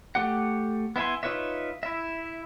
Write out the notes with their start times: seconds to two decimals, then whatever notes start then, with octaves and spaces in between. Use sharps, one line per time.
0.15 A3 G4 F#5
0.96 B3 E4 E5 G#5 C6
1.23 D#4 F4 B4 C#5 E5
1.83 E4 E5